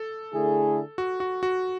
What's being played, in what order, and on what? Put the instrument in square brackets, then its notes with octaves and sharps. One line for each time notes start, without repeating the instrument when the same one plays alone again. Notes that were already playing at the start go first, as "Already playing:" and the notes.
Already playing: [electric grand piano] A4
[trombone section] D3 A3 E4 G#4
[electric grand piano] F#4
F#4
F#4